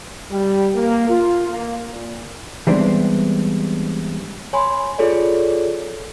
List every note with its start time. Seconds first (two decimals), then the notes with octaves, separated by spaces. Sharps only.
0.31 G3
0.75 A#3
1.09 F4
1.50 A#3
1.91 A#2
2.67 E3 G3 G#3 B3 C4 D4
4.53 C#5 G#5 B5 C6
4.99 F4 G#4 A4 C#5 D5